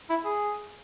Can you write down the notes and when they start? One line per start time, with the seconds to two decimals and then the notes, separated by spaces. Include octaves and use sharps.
0.10 E4
0.25 G#4